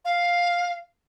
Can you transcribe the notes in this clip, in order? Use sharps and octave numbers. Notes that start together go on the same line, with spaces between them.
F5